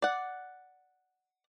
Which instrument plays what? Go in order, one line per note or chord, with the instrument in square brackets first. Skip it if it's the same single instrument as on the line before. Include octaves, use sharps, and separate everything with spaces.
[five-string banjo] D5 F#5